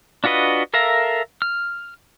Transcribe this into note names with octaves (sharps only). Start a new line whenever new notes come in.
D4 F4 F#4 B4 D#5
A4 A#4 E5 F5 A#5
F6